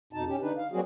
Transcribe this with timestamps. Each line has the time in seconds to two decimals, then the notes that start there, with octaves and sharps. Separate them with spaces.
0.13 F2 B2 D#4 A5
0.27 C#4 G4
0.41 D3 D4 D#4 B4
0.57 F5
0.72 F#3 G3 A#3 C4 F#4 G#4